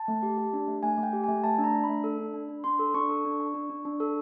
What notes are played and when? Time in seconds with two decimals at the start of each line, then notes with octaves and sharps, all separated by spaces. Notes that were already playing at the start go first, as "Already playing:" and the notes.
Already playing: A5
0.08 A3
0.23 G4
0.38 G4
0.53 D4
0.68 A3
0.83 A3 G#5
0.98 A3
1.03 G5
1.13 G4
1.24 A3 G#5
1.44 A3 A5
1.58 D4
1.64 A#5
1.74 D4
1.84 B5
1.89 A3
2.04 A4
2.19 D4
2.34 D4
2.49 D4
2.64 D4 C6
2.79 A4
2.94 D4 C#6
3.09 A4
3.25 D4
3.40 D4
3.54 D4
3.70 D4
3.85 D4
4.00 A4